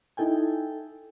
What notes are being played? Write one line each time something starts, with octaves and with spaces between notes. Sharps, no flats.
D#4 E4 A4 G5 G#5